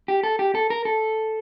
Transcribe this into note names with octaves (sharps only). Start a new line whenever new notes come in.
G4
A4
G4
A4
A#4
A4